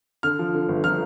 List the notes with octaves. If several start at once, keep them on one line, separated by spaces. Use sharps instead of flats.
D3 F6
F3
D3
G1
F3 F6